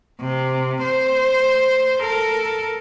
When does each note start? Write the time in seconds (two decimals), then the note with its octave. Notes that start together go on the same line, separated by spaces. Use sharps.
0.21 C3
0.84 C5
1.99 A4 A#4